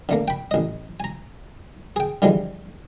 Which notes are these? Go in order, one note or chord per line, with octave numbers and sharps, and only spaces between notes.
D3 A3 A#3
G5 B5
A1 D#5
G#5 A#5
G#4 G5
D3 E3 F3 G3 G#3